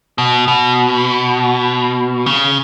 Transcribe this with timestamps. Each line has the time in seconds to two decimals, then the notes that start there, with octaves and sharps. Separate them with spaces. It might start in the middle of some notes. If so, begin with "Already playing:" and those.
0.18 B2
0.48 B2
2.26 C#3